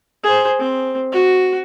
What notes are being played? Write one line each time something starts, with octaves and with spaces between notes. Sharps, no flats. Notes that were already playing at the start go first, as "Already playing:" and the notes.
G#4 C5
C4
F#4